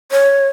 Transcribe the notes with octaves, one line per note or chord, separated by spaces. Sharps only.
C#5